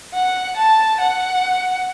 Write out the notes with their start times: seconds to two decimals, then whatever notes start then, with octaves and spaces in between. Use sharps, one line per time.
0.14 F#5
0.57 A5
1.01 F#5